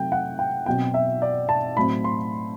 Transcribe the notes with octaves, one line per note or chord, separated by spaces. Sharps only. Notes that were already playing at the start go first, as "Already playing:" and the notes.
Already playing: C3 F#3 A3 G5
F#5
G5
B2 F#3 C4 G5
E5
D5
A5
A2 F#3 C4 B5
C6